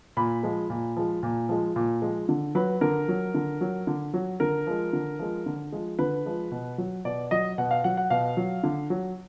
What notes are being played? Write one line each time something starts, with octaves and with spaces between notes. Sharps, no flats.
A#2 B5
F3 G#3
A#2
F3 G#3
A#2
F3 G#3
A#2
F3 G#3
D3
F#3 B4
D3 A#4
F#3
D3
F#3
D3
F#3
D3 A#4
F3 G#3
D3
F3 G#3
D3
F3 G#3
D3 B4
F3 G#3
B2
F#3
B2 D5
F#3 D#5
B2 F#5
F5
F#3 F#5
F#5
B2 F5
F#3
D3
F#3